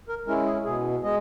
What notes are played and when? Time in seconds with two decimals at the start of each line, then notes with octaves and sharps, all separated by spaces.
0.09 A#4
0.27 G#3 C#4 E4 A#4
0.46 G#4
0.65 B2 G#4
1.03 G#3 D#5